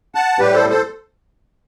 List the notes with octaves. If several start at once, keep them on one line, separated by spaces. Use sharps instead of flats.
F#5 A5
A2 G3 G4 B4
A4 C5
A4 C5